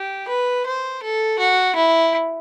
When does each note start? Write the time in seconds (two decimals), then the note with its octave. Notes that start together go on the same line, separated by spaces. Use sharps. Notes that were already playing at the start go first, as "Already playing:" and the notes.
Already playing: G4
0.28 B4
0.66 C5
1.03 A4
1.39 F#4
1.76 E4